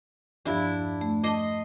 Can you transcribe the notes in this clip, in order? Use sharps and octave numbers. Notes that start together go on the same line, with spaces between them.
E2 G2 F3 D4 E4
A3
D#5 A5 C6 D6